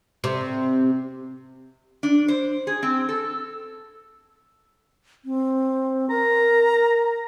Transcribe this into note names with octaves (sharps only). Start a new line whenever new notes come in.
C3
D4
C5
G#4
C4
A4
C4
A#4 A#5